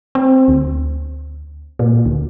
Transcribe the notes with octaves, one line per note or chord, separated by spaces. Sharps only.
C4
D2
A#2
D2